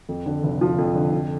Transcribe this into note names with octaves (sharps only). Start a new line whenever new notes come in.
F2
D3
F1
F3
F2
D3
D3